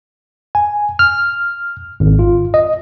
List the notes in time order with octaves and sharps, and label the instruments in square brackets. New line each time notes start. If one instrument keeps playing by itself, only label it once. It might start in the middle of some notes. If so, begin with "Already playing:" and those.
[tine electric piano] G#5
F6
G#1
F4
D#5